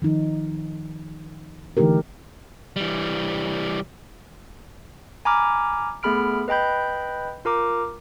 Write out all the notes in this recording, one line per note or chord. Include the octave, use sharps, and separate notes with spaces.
D#3 F3 D#4
D3 E3 A3 D#4 G4 A#4
E3 G3
G#5 A#5 B5 D6 F6
A3 B3 G#4 B5 F6 D7
B4 D#5 G5 B5 G6
F4 A#4 A#5 D6